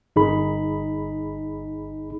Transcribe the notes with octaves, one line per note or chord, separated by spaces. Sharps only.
G1 D#4 G#4 B5